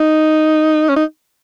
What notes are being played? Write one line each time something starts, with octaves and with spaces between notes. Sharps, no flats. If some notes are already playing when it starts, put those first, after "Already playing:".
Already playing: D#4
C#4
D#4